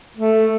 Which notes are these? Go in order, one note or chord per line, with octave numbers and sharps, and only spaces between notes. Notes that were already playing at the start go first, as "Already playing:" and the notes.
A3